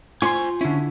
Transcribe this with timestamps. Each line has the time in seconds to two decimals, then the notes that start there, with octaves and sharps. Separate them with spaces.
0.22 F4 C5 G#5 C6 C#6
0.61 D3 C#4 E4